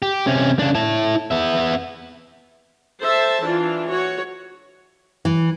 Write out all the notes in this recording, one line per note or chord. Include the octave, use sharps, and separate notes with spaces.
G4
C3 C#4
C#3 D4
E4 A5
B3 E5
A4 C5 E5 A5
E3 D4 F4
F#4 C#5
E3